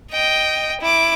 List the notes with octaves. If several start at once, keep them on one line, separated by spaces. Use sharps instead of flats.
D#5 G5
E4 D6